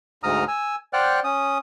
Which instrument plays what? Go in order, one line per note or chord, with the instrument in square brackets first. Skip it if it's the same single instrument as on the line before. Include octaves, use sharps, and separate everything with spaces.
[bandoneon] D2 G#2 A#5 D#6 F6
G#5 E6
C5 D5 F#5 G5 F6 F#6
C#4 D#6